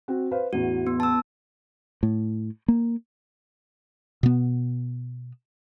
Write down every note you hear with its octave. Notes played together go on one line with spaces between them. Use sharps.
C4 F#4
B4 C5 F5
A1 E2 F#4
B3
A5 E6
A2
A#3
B2 B3